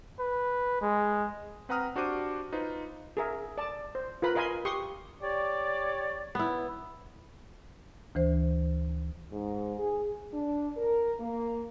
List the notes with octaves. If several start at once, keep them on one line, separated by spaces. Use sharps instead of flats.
B4
G#3
C4 B4 F#5 A#5 D#6 F6
D4 F#4 G4 C5 D6 D#7
D#4 F4 B4 C5
G#4 A#4 E5
D5 A5
C5
F4 A#4 B4 B5
A#4 D#5 F5 G#5 B5 C6
G4 C6 C#6 D#6
G4 C#5 D5
B3 E4
D2 E3 C5
G#2
G#4
D4
A#4
A#3